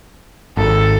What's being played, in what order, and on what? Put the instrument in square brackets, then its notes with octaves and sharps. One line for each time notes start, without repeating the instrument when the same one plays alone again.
[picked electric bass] G#1 [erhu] A4